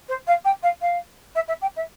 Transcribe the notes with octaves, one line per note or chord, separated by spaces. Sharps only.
C5
F5
G5
F5
F5
E5
E5
G5
E5